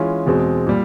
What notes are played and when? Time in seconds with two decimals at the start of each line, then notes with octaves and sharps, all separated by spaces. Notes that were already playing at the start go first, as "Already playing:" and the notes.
Already playing: E3 G#3 C#4 F4
0.26 E2 B2 G#3 C4
0.67 A#2 G3